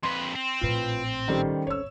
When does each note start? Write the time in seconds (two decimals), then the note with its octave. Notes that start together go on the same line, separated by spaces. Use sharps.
0.03 F2 B4 C6
0.35 C4
0.61 A#1 A2 F4 B4
1.28 D#3 G3 C#4 A4 C5
1.67 G#1 D2 C#5 E6